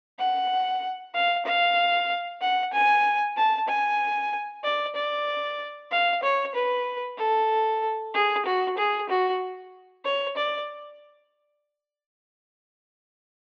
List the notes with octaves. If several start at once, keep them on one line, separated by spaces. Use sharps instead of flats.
F#5
F5
F5
F#5
G#5
A5
G#5
D5
D5
F5
C#5
B4
A4
G#4
F#4
G#4
F#4
C#5
D5